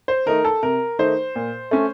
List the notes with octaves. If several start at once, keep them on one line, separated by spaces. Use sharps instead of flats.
C5
D#3 A3 D#4 A#4
A4
C3 A#4
D#3 A3 D#4 C5
A#2
A3 C#4